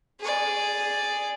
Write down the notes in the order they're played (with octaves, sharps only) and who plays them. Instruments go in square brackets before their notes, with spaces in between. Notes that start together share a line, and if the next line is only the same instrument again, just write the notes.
[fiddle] G#4 D5